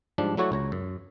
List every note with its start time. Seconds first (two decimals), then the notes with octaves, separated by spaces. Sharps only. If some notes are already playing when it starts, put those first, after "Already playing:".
0.18 G#2 F3 G3 D4
0.37 F#3 A3 E4 F#4 C#5 D5
0.52 C#2 C#5 A#5
0.72 F#2